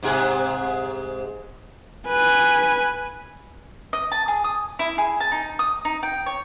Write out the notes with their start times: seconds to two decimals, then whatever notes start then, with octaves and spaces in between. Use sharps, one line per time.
0.03 G#2 C3 G#4
2.08 B4 G#5
3.93 D#5
4.12 A5
4.28 G#4
4.44 D#6
4.79 E4
4.98 G#4
5.20 A5
5.32 D#4
5.59 D#6
5.85 D#4
6.03 G5
6.26 C#5